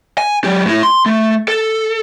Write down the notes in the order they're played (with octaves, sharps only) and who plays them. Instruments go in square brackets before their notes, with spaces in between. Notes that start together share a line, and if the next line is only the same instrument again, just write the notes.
[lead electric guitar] G#5
F#3 G4
A2 E4
C6
A3
A4